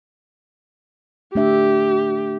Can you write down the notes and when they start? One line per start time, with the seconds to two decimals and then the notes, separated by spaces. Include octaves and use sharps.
1.35 A3 D4 G4 E5